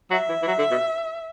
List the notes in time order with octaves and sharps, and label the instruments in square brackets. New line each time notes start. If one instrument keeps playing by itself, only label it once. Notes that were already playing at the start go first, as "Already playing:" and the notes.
[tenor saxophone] F#3 [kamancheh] E5
[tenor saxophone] E3
E3
F#3
D3
B2